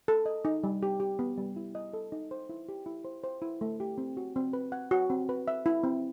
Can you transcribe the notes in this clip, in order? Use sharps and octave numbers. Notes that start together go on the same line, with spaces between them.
A4
D#5
D#4
G3
G4
G4
B3
G3
E4
D#5
A4
D#4
C5
E4
G4
E4
C5
C5
E4
A3
G4
C4
F#4
C4
B4
F#5
F#4
C4
B4
E5
E4
C4